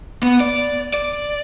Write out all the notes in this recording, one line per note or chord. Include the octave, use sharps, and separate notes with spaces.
B3
D5
D5